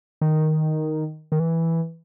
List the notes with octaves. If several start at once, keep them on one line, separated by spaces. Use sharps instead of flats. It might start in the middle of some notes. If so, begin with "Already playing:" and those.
D#3
D#3
E3